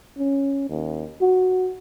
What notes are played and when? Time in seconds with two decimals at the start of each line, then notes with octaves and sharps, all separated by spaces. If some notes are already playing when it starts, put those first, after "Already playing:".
0.19 C#4
0.69 D#2
1.21 F#4